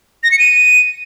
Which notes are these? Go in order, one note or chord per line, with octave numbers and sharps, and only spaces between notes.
A#6
C#7
D#7